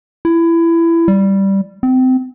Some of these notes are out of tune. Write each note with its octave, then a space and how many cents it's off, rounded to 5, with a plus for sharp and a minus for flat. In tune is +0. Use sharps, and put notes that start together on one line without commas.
E4 +20
G3 -5
C4 -25